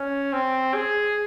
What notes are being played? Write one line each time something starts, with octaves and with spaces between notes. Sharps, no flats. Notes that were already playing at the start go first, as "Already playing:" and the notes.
Already playing: C#4
C4
G#4